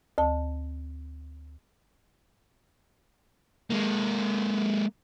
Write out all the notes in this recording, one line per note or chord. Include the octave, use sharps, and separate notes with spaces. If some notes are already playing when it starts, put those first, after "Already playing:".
D2 A5
G#3 A#3